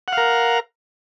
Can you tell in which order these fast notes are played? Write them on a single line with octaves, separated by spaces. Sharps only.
F#5 F5 A#4